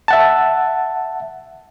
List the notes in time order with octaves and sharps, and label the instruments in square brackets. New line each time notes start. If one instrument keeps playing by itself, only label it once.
[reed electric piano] E5 F#5 A5